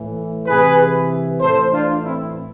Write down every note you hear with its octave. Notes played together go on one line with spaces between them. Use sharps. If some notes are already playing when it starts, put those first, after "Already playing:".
Already playing: A2 E3
C3 E3 G#4 B4
A2 E3 A4 C5
D4 F4
C4 E4